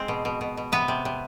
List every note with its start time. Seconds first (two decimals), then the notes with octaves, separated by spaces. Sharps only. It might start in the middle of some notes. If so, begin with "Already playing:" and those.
Already playing: G#3 C4
0.08 B2
0.25 B2
0.41 B2
0.57 B2
0.72 C3 B3 B4
0.88 C3
1.05 C3